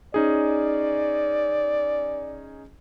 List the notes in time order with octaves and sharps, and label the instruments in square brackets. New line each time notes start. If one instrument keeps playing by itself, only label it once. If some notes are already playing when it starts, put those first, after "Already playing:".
[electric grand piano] C#4 D#4 G#4 [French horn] D5